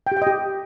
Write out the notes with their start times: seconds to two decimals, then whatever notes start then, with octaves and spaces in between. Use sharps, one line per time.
0.07 G5
0.12 G4
0.17 G5
0.22 D#5
0.27 G4